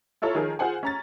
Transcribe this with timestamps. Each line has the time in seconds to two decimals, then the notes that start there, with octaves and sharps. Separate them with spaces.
0.22 E4 F4 A4 C#5 A#5
0.35 D#3 F3 G#4 A#4
0.59 F4 G#4 C5 F#5 G#5
0.83 C#4 A#5 A6